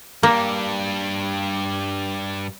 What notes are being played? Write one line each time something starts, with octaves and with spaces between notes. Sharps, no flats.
G2 G3 A#3